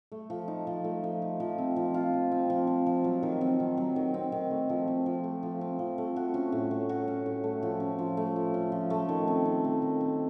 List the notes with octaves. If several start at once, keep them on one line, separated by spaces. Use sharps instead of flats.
A3
F3
D#4
F3
A3
F3
D#4
F3
C4
F3
F4
F3
C4
F3
F4
F3
F#3
D#3
C4
D#3
F#3
D#3
C4
D#3
A3
F3
C4
F3
A3
F3
C4
F3
A3
F#4
C#4
A2
A3
F#4
C#4
A2
A3
F3
C#4
F3
A3
F3
C#4
F3
A3
D#3
C4
D#3
A3
D#3
C4